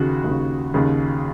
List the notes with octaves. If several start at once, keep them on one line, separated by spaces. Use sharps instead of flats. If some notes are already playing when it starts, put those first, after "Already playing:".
Already playing: D#2 C#3 F#4
D#2 C#3
D#2 C#3